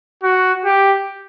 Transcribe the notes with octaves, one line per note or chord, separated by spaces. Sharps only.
F#4
G4